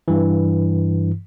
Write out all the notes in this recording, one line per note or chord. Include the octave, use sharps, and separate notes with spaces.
G2 E3